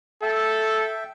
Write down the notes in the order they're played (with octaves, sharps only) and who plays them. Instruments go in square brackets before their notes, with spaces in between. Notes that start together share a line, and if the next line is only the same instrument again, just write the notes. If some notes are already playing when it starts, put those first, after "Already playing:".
[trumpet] A4 [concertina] E5 G5